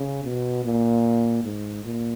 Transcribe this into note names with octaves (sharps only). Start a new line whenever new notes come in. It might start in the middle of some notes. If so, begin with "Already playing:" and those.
Already playing: C#3
B2
A#2
G#2
A#2